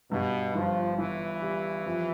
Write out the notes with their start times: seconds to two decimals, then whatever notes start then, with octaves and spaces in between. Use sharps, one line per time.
0.11 G2 B2
0.55 G1 F3
0.98 G1 E3
1.42 G3
1.85 F2